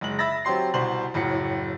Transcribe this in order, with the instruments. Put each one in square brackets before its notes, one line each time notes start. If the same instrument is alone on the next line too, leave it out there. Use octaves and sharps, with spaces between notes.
[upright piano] F#1 G#3 F#7
E5 B5 E6 A6 A#6
F#3 C4 G4 C6 C7
C2 B2 C5 C6 F#7
F#1 A2 F#3 C#7